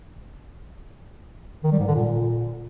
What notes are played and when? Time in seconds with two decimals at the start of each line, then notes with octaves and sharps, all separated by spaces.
1.64 D#3
1.72 G3
1.79 G#2
1.87 D3
1.95 A#2